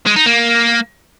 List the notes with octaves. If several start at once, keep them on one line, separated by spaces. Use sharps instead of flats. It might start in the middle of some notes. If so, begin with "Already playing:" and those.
G#3
D#4
A#3